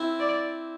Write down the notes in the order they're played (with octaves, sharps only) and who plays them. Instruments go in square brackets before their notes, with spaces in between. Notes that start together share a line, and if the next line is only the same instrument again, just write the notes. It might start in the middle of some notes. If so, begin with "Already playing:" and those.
Already playing: [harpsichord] C4 E4
[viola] D5